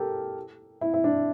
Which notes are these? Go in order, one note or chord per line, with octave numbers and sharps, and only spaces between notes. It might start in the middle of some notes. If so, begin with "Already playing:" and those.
Already playing: G4 A4 A#4
E4
E4
D4